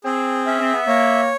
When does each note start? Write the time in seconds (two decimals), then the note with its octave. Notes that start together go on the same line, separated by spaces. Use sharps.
0.04 C4 G#4
0.46 C#4 E5
0.60 C4
0.74 B3
0.87 A#3 C#5